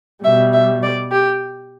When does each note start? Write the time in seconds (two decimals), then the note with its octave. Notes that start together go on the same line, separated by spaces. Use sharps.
0.24 B2 G3 E5
0.53 E5
0.82 D5
1.11 G4